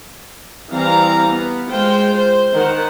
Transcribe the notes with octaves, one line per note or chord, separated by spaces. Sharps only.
E3 G3 C4 F5 A#5
B3
G#3 F4 C5 G5
C5
D#3 F#5